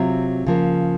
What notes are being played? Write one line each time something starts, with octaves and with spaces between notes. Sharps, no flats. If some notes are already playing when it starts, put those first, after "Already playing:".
Already playing: C3 F#3 C4 F4
C#3 F3 A#3